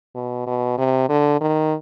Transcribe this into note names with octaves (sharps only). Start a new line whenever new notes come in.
B2
B2
C3
D3
D#3